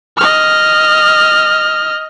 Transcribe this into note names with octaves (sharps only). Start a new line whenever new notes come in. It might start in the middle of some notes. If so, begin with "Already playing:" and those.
D#5 F6